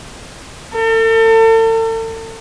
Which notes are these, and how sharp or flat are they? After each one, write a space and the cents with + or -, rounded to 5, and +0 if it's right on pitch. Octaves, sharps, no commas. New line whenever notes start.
A4 +40